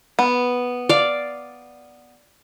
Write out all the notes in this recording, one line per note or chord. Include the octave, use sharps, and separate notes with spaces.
B3
D5 F5